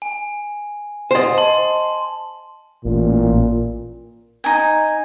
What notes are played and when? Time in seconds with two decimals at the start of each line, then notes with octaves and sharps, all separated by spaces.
0.02 G#5
1.11 C5 D#5
1.37 A5 C6
2.85 A1 A#2
4.44 D#4 G#5